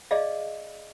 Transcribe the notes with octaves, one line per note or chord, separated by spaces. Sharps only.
G#4 D5 D#5 F5